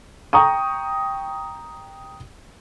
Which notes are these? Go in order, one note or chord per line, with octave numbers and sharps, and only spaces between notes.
G5 A#5 C#6 D#6